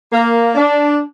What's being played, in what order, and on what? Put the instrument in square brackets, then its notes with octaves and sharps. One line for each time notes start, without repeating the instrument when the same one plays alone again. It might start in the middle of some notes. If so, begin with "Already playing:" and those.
[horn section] A#3
D4